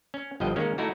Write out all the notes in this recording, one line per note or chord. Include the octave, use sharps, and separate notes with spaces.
C#4
G1 G2 F3 D#5 G5
D#3 G#3 A#3 C#4
A3 D#4 E4 F#4